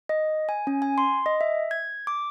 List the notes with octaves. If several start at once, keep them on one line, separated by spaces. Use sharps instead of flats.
D#5
G#5
C#4
G#5
C6
D#5
E5
G#6
D6